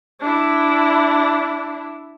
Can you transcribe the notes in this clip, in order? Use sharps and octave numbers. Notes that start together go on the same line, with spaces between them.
D4 E4